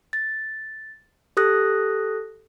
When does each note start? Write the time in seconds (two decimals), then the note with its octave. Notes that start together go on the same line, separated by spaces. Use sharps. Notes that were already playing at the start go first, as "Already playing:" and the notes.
0.13 A6
1.37 G4 A4 D#6 F#6 A#6